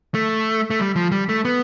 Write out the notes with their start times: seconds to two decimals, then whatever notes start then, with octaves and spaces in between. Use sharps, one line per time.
0.14 A3
0.70 A3
0.79 G3
0.96 F3
1.12 G3
1.29 A3
1.45 B3